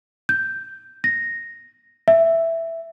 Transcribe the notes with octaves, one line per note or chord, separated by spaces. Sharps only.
G6
A#6
E5